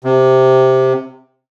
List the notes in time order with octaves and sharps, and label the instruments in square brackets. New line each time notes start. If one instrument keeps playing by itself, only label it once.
[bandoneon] C3